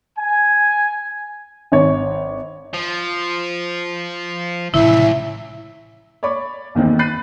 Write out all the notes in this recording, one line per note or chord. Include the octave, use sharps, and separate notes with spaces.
G#5
G#1 C#5
F3
C#2 A2 C3 E3 E4 E5
C#5 D5 B5 C#6 D6
B1 E2 D#3 A#3 C4
B5 F#6 A6 C7 D#7